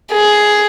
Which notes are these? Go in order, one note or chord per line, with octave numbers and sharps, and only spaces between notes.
G#4